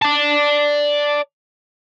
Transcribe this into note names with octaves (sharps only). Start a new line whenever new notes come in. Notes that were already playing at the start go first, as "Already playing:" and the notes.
D5 A5